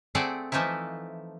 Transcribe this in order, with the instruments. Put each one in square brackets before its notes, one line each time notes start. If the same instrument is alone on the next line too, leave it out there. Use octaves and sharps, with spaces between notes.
[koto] A3 C4 G#4 A4 D5 F#5
E3 F3 A3 D#4 E4